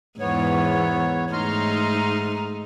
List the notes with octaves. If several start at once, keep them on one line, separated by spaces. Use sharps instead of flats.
E2 G#2 B3 C#5
G#2 A3 D#4 A#5 C6 F6